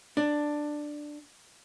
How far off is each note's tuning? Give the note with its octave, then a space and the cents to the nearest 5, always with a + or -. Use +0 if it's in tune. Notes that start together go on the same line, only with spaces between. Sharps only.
D4 +10